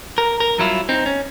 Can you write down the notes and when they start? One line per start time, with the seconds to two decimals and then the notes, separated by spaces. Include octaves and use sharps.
0.18 A#4
0.40 A#4
0.58 G2 F#3 E4 F4
0.89 C4 D#4
1.06 C#4